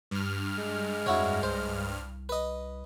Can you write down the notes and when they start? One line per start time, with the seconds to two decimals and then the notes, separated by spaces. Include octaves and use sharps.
0.11 G2 F6
0.58 G#3
1.06 F2 E4 F#4 C#5
1.43 C2 C5
2.29 B4 D#5